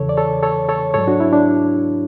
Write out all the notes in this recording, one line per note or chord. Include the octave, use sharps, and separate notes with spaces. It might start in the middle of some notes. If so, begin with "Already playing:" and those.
Already playing: E2 C#3 E3 A4 C#5
D5
A4 C#5
A4 C#5
A4 C#5
G#2 F#3 A4 C#5
D4 F#4
E4
D4